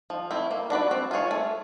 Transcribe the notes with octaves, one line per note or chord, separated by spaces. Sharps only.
F3
A3 C4 E4
A#3
D4 F#4 B4 D5
C4
F4 G#4 C#5
A3